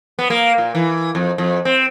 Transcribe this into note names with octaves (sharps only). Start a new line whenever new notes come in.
B3
A#3
A#2
E3
F2
F2
C4